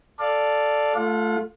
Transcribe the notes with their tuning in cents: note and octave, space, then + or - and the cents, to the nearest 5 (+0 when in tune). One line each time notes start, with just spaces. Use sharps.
A4 +0 D5 +0 F5 +0
A3 +0 F4 -10 F#5 -45